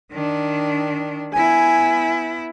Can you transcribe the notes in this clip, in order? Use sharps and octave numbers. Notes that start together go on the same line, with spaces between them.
D#3 D4
B3 E4 G#5